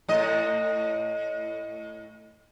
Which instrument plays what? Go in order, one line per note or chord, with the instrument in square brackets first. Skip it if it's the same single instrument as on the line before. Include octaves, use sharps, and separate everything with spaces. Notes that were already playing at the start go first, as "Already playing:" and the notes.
[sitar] A2 D#5